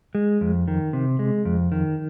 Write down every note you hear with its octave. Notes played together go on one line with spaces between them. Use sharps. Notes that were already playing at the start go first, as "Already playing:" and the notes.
G#3
F2
D#3
C3
G#3
F2
D#3